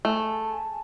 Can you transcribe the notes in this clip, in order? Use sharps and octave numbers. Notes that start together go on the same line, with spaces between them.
A3 G#4 G#5 A5